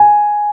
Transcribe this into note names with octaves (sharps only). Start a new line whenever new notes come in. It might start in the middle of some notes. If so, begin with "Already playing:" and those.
Already playing: G#5